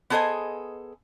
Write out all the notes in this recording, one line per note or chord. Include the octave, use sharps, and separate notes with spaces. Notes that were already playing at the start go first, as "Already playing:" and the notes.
B3 G#4 A4 C5 D#5 G#5